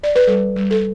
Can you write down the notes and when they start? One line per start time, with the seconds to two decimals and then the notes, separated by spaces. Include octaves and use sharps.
0.03 D5
0.16 B4
0.27 G3 A4
0.56 G3
0.71 A4